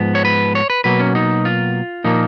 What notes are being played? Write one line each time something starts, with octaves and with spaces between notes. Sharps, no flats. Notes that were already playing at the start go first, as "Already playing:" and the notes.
Already playing: G#2 F3 B3
C#5
B4
C#5
B4
B2 F#3 A#3 B4
C#4
D#4
F4
A#2 F3 A#3 D#4